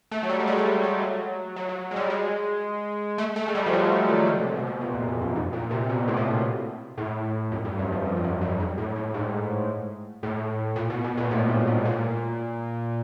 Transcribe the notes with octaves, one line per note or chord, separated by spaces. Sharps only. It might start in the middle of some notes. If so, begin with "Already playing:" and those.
A3
F#3
G3
G#3
G3
G3
F#3
G3
F#3
F#3
F#3
G#3
G3
G#3
A3
A3
G#3
G3
F3
F#3
F3
D#3
D3
C3
B2
B2
A#2
F2
F2
F#2
G#2
A#2
C3
B2
A2
A#2
A2
F#2
G2
F#2
F2
F#2
G2
F#2
G2
G#2
A2
A2
G#2
A2
A#2
B2
B2
A#2
A2
G#2
G#2
B2
A#2